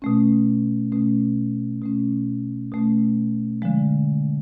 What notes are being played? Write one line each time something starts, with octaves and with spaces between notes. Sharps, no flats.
B2 A3 C#4
B2 A3 C#4
B2 A3 C#4
B2 A3 C#4
D3 F3 G#3